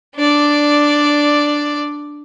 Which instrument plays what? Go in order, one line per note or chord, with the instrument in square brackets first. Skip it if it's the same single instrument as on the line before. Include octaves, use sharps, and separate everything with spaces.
[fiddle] D4 D5